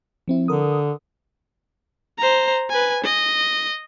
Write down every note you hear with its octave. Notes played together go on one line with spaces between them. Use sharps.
F3 C4 E4
D3 A#4 D#6
C5 A#5
B4 G#5
D#5